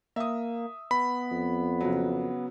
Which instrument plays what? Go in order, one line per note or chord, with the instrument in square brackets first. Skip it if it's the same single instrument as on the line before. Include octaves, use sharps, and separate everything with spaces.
[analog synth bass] A#3 [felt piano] E5 D#6
[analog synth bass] B3 [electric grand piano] B5
[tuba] F2
[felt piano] C#3 F#3